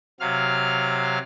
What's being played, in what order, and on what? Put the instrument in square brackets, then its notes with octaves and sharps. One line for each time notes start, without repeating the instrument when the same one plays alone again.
[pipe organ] C3 F#3 F5 F6